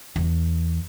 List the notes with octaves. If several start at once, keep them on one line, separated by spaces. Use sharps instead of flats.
E2